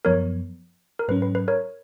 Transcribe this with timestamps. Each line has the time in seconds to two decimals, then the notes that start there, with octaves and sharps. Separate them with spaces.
0.05 F#2 F3 B3 A#4 C#5
0.99 A#4
1.08 G#2 F#3 C#4 B4
1.22 B4
1.35 B4
1.48 A#4 C#5